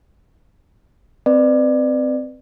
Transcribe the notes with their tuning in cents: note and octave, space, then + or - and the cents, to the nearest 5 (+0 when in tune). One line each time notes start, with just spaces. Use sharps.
C4 -15 B4 +0 D5 +25